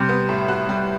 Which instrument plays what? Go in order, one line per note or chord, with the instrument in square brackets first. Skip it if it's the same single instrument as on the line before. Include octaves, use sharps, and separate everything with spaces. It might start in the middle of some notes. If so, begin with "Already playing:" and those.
Already playing: [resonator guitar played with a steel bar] C3 [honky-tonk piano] G3
[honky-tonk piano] B3
A2
F#4
G3